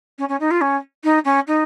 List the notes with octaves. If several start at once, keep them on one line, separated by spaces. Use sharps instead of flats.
C#4
C#4
D#4
F4
C#4
D#4
C#4
D#4